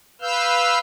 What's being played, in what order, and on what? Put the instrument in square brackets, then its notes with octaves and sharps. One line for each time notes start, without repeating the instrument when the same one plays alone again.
[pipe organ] B4 F5 E6 F6 G6